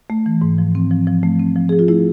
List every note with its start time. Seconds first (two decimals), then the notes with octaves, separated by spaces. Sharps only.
0.10 A3
0.26 E3
0.42 G#2
0.58 F3
0.75 C4
0.91 F3
1.07 F3
1.23 A3
1.39 C4
1.56 F3
1.69 F3 G#4
1.79 F4
1.88 A3 E4